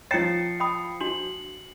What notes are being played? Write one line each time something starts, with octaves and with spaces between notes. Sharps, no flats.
F3 C#5 G5 A#5 A6 C7 C#7
G5 B5 D#6
D4 F#4 F#7